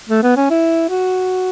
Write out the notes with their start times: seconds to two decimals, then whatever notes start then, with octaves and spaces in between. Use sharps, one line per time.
0.09 A3
0.23 B3
0.37 C#4
0.50 E4
0.89 F#4